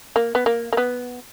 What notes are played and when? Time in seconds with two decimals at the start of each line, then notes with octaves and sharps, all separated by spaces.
0.16 A#3
0.35 B3
0.46 A#3
0.73 A#3
0.77 B3